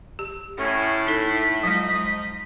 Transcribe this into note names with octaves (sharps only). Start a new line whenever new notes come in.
G4
A2 C#4
D#4 A4 B6
F3 F#3 G#3 D#4 D#5